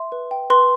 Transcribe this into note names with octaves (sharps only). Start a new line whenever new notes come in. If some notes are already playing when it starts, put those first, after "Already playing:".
Already playing: E5 C6
B4
G5
B4 C6